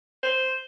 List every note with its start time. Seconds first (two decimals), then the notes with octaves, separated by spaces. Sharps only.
0.23 C5